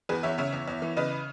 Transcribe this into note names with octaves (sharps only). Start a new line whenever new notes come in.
E2 G#4 B4
E2 C#5 E5
C#3 C#5 E5
E2
E2
E3
C#3 B4 D#5